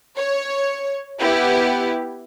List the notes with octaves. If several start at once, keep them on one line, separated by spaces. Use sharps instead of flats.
C#5
B3 E4 G4